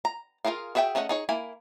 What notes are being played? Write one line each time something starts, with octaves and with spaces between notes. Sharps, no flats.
A#5
F4 F#4 G#4 A#4 F5
F#4 G#4 E5 F#5 G5
A3 C#4 G#4 D#5 F#5
D#4 G#4 C#5
A#3 E4 G#5